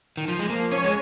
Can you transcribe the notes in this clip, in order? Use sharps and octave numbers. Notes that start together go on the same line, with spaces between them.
D#3
F3
G#3
F3 A#3
C#4 C#5
G#3